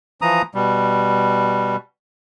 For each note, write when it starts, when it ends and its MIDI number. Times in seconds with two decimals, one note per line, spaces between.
0.22 0.42 52
0.22 0.42 53
0.22 0.42 82
0.22 0.42 87
0.55 1.76 47
0.55 1.76 55